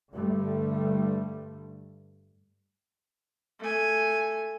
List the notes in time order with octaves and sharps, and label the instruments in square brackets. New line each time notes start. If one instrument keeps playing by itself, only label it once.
[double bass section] G2 D3 G3 A3
[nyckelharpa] A3 G#5